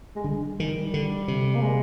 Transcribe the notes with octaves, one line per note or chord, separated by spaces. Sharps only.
G#3
D3 G3
D#3
D3
C3
A#3
G#3